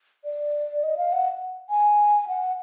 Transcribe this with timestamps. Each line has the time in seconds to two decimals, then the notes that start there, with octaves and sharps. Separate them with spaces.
0.25 D5
0.83 D#5
0.97 F5
1.13 F#5
1.70 G#5
2.28 F#5